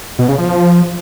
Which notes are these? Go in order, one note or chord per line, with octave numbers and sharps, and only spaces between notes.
B2
C#3
F3